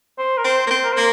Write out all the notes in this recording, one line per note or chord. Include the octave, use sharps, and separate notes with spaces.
C5
A#4
C4 C5
A#3
C4
A#4
C5
A#3